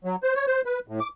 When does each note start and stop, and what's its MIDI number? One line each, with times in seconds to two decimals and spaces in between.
0.05 0.16 54
0.23 0.34 72
0.35 0.46 73
0.47 0.61 72
0.65 0.79 71
0.88 1.00 45
1.00 1.08 86